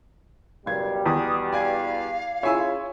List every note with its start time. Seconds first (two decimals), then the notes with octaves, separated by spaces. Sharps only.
0.66 F#1 B2 G3 F5 G#6
1.06 E2 D#6
1.52 D5 F5 G#5 G#6
2.43 C#3 E4 F4 C#5 E5 G#5 E6